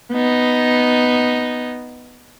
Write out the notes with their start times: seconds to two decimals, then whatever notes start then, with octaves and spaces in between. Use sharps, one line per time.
0.12 B3 D#4